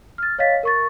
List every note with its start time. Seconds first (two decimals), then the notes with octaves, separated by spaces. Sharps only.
0.18 F6 A6
0.39 C#5 D#5 F5 A6 B6
0.63 A#4 C#6 A6